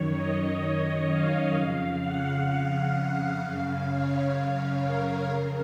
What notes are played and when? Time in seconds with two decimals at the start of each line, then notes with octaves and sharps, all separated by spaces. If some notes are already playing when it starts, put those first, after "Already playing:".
Already playing: F#2 D#3 C#5
0.14 D#5
1.08 F5
1.54 F2 C#3
2.02 F#5
2.48 F5
2.95 F#5
3.41 F#2 C#3 F5
3.89 C#5
4.35 C#5
4.82 A#4
5.28 F2 C#3 A#4